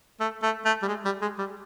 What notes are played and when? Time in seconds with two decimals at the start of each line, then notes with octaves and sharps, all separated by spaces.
0.20 A3
0.43 A3
0.65 A3
0.83 G3
0.88 G#3
1.05 G3
1.22 G#3
1.39 G3